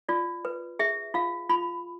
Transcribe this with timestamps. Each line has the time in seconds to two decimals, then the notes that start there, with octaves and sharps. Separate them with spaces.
0.09 F4 D5
0.45 B4
0.79 G#4 E5
1.14 F4 F5
1.49 F4 B5